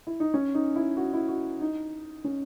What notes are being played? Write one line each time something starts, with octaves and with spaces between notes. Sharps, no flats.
E4
D#4
C#4
D#4
E4
F#4
E4
F#4
D#4
C#4